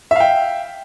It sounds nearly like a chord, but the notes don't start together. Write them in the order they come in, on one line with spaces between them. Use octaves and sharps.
E5 F5 G5